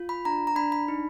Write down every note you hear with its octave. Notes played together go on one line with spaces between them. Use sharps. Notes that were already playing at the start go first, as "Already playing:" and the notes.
Already playing: F4
B5
D4 A#5
A#5
D4 B5
B5
D#4